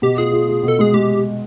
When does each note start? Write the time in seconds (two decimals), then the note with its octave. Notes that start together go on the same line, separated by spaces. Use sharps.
0.02 B2 G4
0.18 F4 G#4
0.33 F4
0.48 F4
0.63 B2
0.68 A4
0.79 G#3 G#4
0.94 G#3 G4